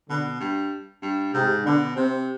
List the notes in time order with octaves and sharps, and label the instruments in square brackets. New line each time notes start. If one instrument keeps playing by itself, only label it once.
[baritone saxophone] B2 [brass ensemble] D3
[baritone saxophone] G2
G2
[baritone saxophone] G#2 [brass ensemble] C3
[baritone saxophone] B2 [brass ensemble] D3
[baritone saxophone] C3 [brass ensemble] C4